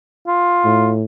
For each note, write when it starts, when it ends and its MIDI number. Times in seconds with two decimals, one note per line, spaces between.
0.27 0.94 65
0.65 1.04 45